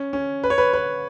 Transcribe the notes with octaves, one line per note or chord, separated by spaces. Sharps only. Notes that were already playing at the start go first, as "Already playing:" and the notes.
Already playing: C#4
C#4
B4
C#5
B4
B4